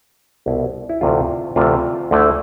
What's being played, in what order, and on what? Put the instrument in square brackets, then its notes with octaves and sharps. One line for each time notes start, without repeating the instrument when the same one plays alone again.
[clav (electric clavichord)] C2 B2 B3 E4
E4
D2 C3 E3 A3 F4
D2 C3 E3 A3 F4
D2 D3 A3 E4